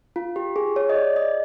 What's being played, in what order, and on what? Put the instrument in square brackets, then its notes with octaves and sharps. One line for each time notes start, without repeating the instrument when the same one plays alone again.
[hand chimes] F4
G4
G#4
C#5
D#5
D5
D#5